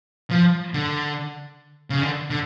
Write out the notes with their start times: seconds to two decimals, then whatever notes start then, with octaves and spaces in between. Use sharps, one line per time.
0.31 F3
0.74 D3
1.90 C#3
2.02 D3
2.30 D3